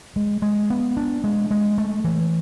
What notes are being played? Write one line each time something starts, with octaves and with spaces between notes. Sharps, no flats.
G#3
G#3
B3
D4
G#3
G#3
A3
E3